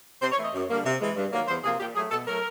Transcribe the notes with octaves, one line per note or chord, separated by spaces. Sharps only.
C3 C5
C#5
E3 A3 D#5
F#2
D3 G3 A#3
C3
E3 G#3
G2
D#3 F#3 A#3
E2 C5
C3 F3 A#3 G#4
A#2 G4
F#3 A3 G#4
B2 A4
F#3 A3 A#4